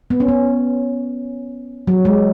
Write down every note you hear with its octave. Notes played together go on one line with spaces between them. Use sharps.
B3
C#4
B3
F#3
G#3